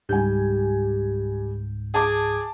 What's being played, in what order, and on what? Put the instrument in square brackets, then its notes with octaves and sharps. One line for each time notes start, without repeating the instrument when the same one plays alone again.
[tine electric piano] C#2 G#2 G6 [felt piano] G3 G4 G#5
[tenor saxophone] G#4 [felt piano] A5 D6